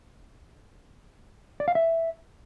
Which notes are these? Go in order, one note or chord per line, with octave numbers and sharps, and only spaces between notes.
D5
F5
E5